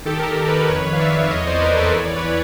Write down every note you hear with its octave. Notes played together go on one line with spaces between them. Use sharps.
D#3 G4 A4
A#4
G4 A4
D#3
A4 B4
F2 B4 C#5
F5
F2 D5 E5
E2 C#5 D#5
C5 D5
B4
E2 A#4 C5
A4 B4
E3 C#5
D5
B4 C#5
E3